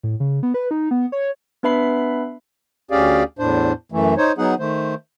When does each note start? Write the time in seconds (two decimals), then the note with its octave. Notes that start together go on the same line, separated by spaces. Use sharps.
0.03 A2
0.20 C#3
0.43 B3
0.54 B4
0.71 D#4
0.91 B3
1.12 C#5
1.63 B3 D4 B4 E5 B5 C7
2.91 D2 C#4 G4 G#4 D5 F5
3.39 E2 A2 D4 C5
3.92 F#2 E3 A3
4.18 D#4 C5 C#5
4.38 F#3 B3 D#4 G#4 F#5
4.59 D#3 A3 C5